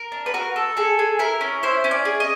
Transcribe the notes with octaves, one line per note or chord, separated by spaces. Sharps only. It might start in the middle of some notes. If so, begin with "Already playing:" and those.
Already playing: A#4
D4
B4
F#4 A#4
A4
G#4 A4
G#4
E4 A#4
C#4
E4 C5
C#4
D5
G#4
D#5